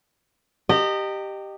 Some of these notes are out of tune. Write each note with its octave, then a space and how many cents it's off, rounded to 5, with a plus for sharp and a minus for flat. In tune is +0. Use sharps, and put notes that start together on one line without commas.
G4 +0 D#5 -20 A#5 -40